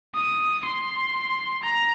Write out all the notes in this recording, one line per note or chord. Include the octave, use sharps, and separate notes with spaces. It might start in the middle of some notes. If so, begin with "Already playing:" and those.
D#6
C6
A#5